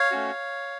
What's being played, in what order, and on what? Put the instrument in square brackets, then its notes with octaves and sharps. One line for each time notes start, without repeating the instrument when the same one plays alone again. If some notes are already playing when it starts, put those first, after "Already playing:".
Already playing: [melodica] C#5 F5
A3 C#4 F#4